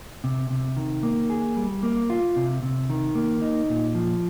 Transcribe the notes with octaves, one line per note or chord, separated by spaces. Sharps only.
C3
C3
D#3
A#3
G#4
G3
A#3
F4
C3
C3
D#3
A#3
D#4
A#2
F3